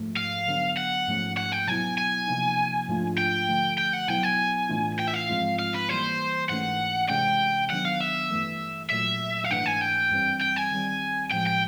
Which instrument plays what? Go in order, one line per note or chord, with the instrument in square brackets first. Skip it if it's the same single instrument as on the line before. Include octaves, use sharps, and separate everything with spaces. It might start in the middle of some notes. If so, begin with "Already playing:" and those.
Already playing: [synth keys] G#2 F3 A3
[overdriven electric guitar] F5
[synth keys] D3 F#3 B3 D4
[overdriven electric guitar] F#5
[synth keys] G#2 F3 A3 C#4
[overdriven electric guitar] F#5
G5
[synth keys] B2 F#3 B3 E4 [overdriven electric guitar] G#5
[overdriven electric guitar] G#5
[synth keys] C3 F3 A#3 D#4
G#2 F3 A3 D4 F4
[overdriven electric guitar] G5
[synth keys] D3 F3 A3
[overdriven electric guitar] G5
F#5
[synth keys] B2 F#3 B3 E4 [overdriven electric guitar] G5
[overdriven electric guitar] G#5
[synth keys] A2 E3 A3 D4 F4
[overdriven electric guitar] G5
E5
F5
[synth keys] G#2 F3 G#3 C4 F4
[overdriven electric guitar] F5
B4
[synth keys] E3 G3 A#3 [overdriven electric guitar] C5
[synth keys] G#2 E3 A3 C#4 [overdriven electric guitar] F#5
[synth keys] C3 E3 G#3 C#4 [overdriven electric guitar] G5
[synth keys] D#3 F#3 B3 D4 [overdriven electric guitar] F#5
[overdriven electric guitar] F5
E5
[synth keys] G2 E3 A3
[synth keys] A#2 F#3 A3 [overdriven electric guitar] E5
[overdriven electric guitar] F5
[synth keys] G#2 E3 A3 D4 [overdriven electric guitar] F#5
[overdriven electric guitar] G#5
G5
[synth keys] G2 E3 G3 C4
[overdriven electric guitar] G5
G#5
[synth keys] D#3 G3 C4
[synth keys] A2 F3 G#3 [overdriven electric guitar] G5
[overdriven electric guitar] G5